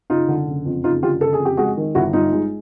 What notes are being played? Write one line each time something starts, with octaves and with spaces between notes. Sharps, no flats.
F#1 D#4 F4
D3
F#1
F2
F#1 D#4 F4
D3 F4 G4
F#1 A4
G#4
F2
G4
G#3 F#4 G#4
D#3
G1 E4 F#4
G2 D#4 F4
G#3